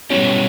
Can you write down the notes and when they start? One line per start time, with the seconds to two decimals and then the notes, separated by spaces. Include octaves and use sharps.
0.10 B2 G3 B3 C#4 E4 G4